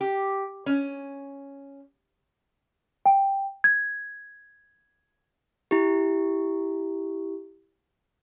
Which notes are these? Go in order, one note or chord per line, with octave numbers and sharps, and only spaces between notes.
G4
C#4
G5
G#6
E4 G4